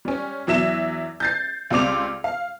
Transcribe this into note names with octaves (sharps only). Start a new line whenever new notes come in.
G3 C#4
E2 F#3 E5 E7
G6 A6 C7
C#2 G3 C4 D6 F7
F5